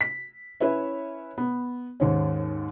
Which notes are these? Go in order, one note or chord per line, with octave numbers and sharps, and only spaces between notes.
B6
C#4 E4 B4 C#5 E5
B3
D#2 G#2 C#4